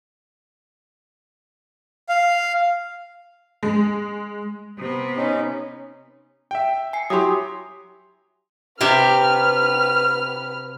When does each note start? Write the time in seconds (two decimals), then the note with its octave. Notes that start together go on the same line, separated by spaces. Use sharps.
2.09 F5
3.63 G#3
4.78 C3 B3
5.17 C#4 D#4
6.51 E5 G5
6.93 G#5 C7
7.10 F#3 E4 G4 C6 D#6
8.81 C3 G4 B4 E5 F6